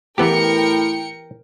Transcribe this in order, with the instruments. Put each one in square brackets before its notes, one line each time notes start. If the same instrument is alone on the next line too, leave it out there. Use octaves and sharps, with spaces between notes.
[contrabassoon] A2 [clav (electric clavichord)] E3 B3 G4 [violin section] A#4 G5 C#7